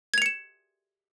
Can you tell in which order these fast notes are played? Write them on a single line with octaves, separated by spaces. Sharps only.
G#6 F7 C#7 E7